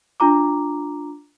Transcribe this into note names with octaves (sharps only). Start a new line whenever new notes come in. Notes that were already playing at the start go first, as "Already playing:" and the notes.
D4 F4 A#5 D6